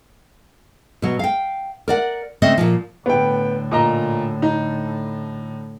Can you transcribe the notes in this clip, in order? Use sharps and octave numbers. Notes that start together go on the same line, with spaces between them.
B2 F#3
F5 G5
A#4 D5 F#5
C#3 A3 C4 D#5 E5
A#2 E3 F3
A2 D3 B3 G5
A#2 D#5 A#5
D#4